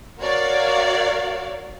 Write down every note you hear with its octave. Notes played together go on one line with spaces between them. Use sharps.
F#4 A#4 C#5 D5 F5